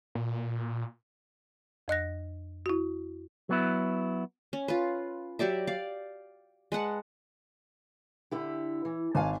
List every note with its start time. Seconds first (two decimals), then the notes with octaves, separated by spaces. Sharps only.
0.15 A#2
1.88 F2 D#5 F#6 A#6
2.66 E4 F#4
3.49 F#3 B3 E4
4.53 C#4
4.68 F4 B4
5.39 F#3 G4 D5 E5
5.67 D5 F5
6.72 G#3 B4 F#5 A5
8.31 D3 E4 G4
8.85 E3
9.15 G#1 F5 G#5 A5